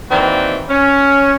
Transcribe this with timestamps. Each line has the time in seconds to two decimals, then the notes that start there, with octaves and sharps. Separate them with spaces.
0.10 D#3 E3 A#3 C4 F#4 D5
0.69 C#4